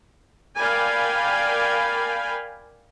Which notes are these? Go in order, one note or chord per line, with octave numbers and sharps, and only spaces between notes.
A#4 D5 F5 G5 G#5 B5